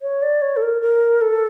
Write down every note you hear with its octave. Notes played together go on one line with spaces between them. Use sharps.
C#5
D5
C#5
A4
A#4
A#4
A4